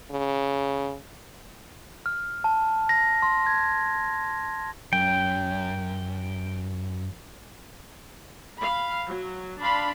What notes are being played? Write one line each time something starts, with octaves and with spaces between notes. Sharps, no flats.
C#3
F6
A5
A#6
C6
G#6
F#2 G5
F5 B5
F#3
D4 F5 B5 C6